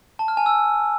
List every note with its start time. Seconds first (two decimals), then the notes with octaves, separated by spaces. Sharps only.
0.19 A5
0.28 F6
0.37 G#5
0.46 E6